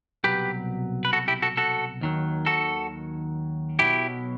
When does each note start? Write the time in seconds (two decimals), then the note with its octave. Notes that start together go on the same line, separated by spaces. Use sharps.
0.24 C2 B2 F#3 G4 B4
1.05 B4
1.13 F#4 A4
1.28 E4 G4
1.42 F#4 A4
1.57 F#4 A4
2.01 D#2 D#3 F#3
2.46 F#4 A4
3.79 B1 B2 F#3 E4 G4